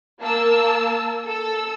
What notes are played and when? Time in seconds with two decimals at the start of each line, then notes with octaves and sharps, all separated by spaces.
0.20 A#3 A5 E6
1.26 A4 E6